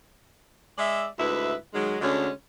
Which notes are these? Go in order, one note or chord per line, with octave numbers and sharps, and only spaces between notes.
G#3 D5 E5
D2 G#2 E4 B4 E5
D#3 F#3 G#3
D2 D3 G#3 C#4